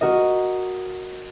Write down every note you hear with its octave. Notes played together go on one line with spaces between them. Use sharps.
F#4 A#4 D#5